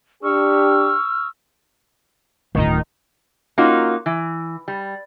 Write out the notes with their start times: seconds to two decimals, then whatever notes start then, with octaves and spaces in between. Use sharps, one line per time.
0.22 D4 G4 C#6 E6 F6
2.55 D1 D#3 D#4 F4
3.58 A#3 C#4 D#4 F4 F#4
4.06 E3
4.68 G3